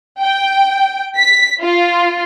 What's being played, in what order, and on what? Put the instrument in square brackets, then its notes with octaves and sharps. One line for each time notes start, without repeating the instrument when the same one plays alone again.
[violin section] G5
B6
F4